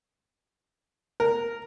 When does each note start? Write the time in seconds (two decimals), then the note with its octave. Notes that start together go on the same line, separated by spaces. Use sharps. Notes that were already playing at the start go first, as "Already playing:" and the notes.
1.20 A#4